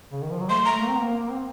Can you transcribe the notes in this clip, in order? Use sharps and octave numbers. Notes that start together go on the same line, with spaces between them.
C#3
D#3
F3
F#3
A3 C6
A3 A#5
A#3
C4
A#3
A#3
C4